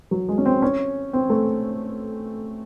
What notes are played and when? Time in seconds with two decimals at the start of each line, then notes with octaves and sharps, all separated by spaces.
0.11 F#3
0.29 G#3
0.38 C#4
0.45 C4
0.62 C#4
1.13 C4
1.30 A3